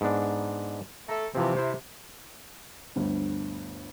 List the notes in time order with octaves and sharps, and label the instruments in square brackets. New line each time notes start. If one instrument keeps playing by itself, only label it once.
[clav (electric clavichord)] G#2 B3 D4
[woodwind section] A3 A4 [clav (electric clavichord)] A#5
[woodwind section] C3 [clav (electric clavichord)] E3 F3 C4
[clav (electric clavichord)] E4 C5
[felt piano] G1 D2 G2